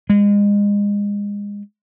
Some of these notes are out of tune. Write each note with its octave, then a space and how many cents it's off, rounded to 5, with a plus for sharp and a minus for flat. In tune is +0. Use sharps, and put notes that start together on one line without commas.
G#3 -30